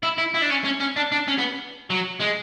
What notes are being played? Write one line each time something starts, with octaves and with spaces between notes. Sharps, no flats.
E4
E4
E4
D4
C#4
C#4
C#4
D4
D4
C#4
B3
F#3
G#3